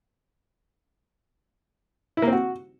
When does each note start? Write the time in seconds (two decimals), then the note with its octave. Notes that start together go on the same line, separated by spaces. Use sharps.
2.17 E4
2.22 A#3
2.27 C4
2.33 F#4